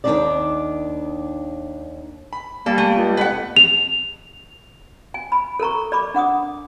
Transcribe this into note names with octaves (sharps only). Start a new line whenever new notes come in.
D#2 D#3 A#3 D4 D#4 D5
B5
G3 A#3 A4
A3
C#2
F2 B4 F#5
F7
G#5
B5
A4 A#4 A#5 C#6
D5 B5 D6
D4 F#5 D6 D#6